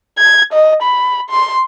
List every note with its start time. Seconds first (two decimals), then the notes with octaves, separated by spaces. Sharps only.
0.19 G#6
0.53 D#5
0.82 B5
1.30 C6